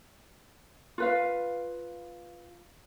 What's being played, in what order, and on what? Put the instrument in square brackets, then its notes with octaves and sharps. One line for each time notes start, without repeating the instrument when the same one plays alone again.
[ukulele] F4 B4 F5